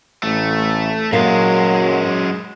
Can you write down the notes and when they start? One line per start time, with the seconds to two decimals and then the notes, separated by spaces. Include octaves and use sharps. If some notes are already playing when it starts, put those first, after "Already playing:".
0.23 A1 A3
1.13 F#2 A#2 F#3 G#3 A#4 F5